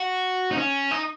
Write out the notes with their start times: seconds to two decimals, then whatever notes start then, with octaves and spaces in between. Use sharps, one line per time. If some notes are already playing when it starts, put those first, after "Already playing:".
Already playing: F#4
0.51 D#4
0.57 C#4
0.91 D#4